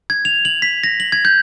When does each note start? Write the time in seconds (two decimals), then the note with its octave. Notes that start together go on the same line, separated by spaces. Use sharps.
0.10 G#6
0.25 F7
0.45 F#7
0.62 B6
0.84 A#6
1.00 F#7
1.12 G#6
1.25 G6